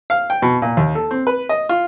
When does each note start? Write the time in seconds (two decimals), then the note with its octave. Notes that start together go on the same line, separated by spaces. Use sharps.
0.10 F5
0.30 G5
0.42 B2
0.62 A#2
0.77 D#2
0.95 A4
1.11 C4
1.27 B4
1.49 D#5
1.69 F4